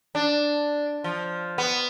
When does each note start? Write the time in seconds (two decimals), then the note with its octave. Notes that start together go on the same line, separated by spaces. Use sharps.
0.15 D4
1.04 F3
1.58 B3